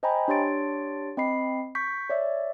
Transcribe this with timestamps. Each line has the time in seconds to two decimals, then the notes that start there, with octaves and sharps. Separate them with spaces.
0.03 C5 D#5 G5 G#5 A#5 B5
0.28 D4 G4 C#5 C6 A6 D7
1.17 C4 D#5 B5 C7
1.75 C#6 G6 B6
2.09 C#5 D5 E5